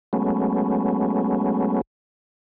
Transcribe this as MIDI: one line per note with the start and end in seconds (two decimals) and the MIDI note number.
0.13 1.81 54
0.13 1.81 56
0.13 1.81 57
0.13 1.81 59
0.13 1.81 61